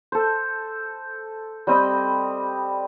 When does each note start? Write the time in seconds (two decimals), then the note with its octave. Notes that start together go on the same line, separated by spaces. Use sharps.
0.12 A4 C5
1.67 G3 C4 D#5 B5